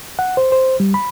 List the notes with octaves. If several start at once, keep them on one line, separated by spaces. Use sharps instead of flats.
F#5
C5
C5
G3
B5